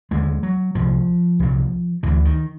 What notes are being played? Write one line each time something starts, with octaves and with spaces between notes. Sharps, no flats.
D#2 D3 G#3
F#3
C2 A#2 F3
C2 A#2
D2 D3 E3
D#3